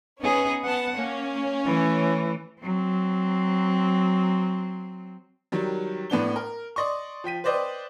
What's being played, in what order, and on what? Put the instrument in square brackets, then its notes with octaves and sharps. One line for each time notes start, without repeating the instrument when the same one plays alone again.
[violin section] B3 C#4 [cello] D#4 G#4
[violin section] B3 A5 [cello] F#5
[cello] A#3 [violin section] C#4
[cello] E3 A3
F#3 C4
[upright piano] D#3 F#3 G3
A2 B3 D4 G7
A#4
D5 D#5 C6 C#6
F3 G5 B6 D#7
B4 C5 D5 D#5 G5